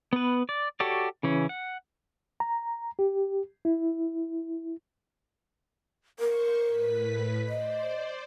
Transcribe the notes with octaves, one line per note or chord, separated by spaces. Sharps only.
B3 B4
D5
F#4 G4 A4 C#5 D5
C#3 E3 C#4
F#5
A#5
G4
E4
A#4 C5 C#6
A2 B4 B6
C5 D5 D#5